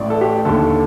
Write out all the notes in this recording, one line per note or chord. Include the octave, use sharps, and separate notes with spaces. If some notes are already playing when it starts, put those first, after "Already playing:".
Already playing: A1 A2 D5
A4
G4
D#2 D3 A4
A4
A4